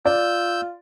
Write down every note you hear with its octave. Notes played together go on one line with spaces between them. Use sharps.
F4 D5 E6 G6